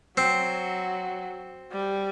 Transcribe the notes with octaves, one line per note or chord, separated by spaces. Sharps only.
F#3 C4
G3